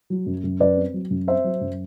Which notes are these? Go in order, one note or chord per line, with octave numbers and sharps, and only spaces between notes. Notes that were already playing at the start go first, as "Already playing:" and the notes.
F#3
F#2
F#2
F#2 B4 D5
C4
F#3
F#2
C4 C5 E5
F#3
F#2